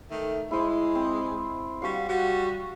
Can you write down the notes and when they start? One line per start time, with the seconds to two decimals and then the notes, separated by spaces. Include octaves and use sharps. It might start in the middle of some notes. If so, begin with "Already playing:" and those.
0.10 D#3 A3
0.51 G#3 E4 C5
0.95 C4
1.82 G3 F#4 F5 C#6
2.08 G3 F#4